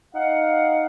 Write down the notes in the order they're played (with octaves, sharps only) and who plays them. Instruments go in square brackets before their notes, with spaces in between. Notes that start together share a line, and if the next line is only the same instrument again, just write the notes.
[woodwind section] D#4 F5 F#5